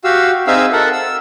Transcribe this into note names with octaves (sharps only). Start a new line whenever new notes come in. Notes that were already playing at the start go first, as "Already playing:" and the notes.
F#4 G4 F5 E6
C4 D#4 G#4 E5 F5 E6
A4 A#4 E5 F#5
E6